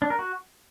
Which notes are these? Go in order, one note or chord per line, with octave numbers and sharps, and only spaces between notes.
D4
A#4
F#4